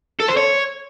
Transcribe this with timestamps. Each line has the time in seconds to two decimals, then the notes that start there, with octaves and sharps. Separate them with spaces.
0.20 A4
0.29 C5
0.37 C#5